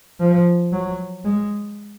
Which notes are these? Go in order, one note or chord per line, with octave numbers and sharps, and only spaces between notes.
F3
F#3
G#3